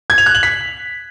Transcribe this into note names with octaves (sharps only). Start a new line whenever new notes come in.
G#6
F7
F#6
F#7
B6